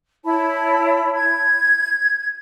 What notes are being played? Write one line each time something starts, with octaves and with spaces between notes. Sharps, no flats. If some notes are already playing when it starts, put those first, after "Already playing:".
E4 C#5 A5 B5
G#6